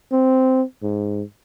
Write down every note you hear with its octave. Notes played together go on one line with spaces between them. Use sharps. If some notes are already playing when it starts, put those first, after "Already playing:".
C4
G#2